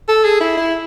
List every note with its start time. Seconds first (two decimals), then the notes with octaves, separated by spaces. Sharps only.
0.08 A4
0.25 G#4
0.40 E4
0.57 E4